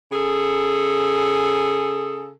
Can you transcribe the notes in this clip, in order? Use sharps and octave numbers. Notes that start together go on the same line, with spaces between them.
C#3 G#4 A4